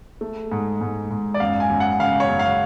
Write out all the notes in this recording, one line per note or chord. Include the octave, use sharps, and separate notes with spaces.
A3
G#2
G#2
G#2
D5
F#2 F5
G#5
F#2
F#5
C#3 F5
C#5
F#2
F5